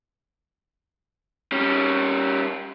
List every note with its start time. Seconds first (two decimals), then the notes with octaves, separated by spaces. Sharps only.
1.52 G3 C#4